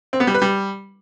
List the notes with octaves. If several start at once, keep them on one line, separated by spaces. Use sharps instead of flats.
C4
B3
G3
B4
G3